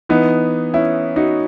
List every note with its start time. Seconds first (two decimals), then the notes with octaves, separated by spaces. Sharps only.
0.09 E3 B3 D#4
0.74 C#4 E4
1.16 D#4 F#4